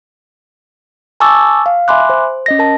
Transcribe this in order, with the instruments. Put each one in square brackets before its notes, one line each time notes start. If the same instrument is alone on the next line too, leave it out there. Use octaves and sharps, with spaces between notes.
[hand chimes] G#5 A5 C#6 D6 E6 A6
F5
E5 G#5 B5 C6 D6 F#6
C5
C#4 D#5 A#6
A#4 A5